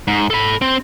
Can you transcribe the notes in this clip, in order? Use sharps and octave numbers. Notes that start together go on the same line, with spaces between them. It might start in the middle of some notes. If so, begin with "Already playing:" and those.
G#2
A4 B5
C4